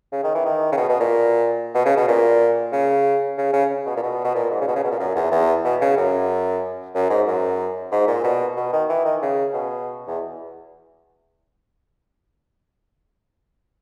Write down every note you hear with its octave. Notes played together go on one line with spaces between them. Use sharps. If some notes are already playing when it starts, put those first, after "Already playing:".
C#3
D#3
E3
D#3
C#3
B2
B2
A#2
B2
C#3
B2
A#2
C#3
C#3
C#3
B2
A#2
B2
B2
A#2
G#2
C#3
B2
C#3
B2
A#2
F#2
E2
E2
B2
C#3
F#2
F#2
G#2
F#2
G#2
A#2
B2
B2
D#3
E3
D#3
C#3
B2
E2